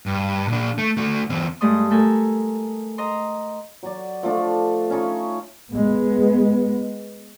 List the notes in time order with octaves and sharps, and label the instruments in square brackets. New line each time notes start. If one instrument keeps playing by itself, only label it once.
[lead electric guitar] G2
A#2 D4
A3
A3 F#4
E2 C4
[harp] G2 G#3 A3 A5 C6 D#6
A3 A4 A#4 G#5
D#5 A#5 C6
[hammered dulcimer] F#3 D5
F3 A3 D4
C#4 D#4 F4
[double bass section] G#3 B3